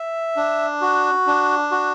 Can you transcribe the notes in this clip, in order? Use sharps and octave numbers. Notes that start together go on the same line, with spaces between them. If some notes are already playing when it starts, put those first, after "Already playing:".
Already playing: E5
D4
F#4
D4
F#4